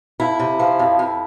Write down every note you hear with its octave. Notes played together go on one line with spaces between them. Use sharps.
F2 E4
C3
F3
F2
F2